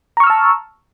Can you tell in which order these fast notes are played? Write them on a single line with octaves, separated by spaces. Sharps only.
A#5 C#6 F6 E6 A5